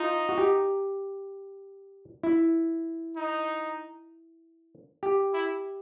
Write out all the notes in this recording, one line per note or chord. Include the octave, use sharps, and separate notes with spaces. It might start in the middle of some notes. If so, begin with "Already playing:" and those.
Already playing: D#4 F4
F#4
G4
E4
D#4
G4
E4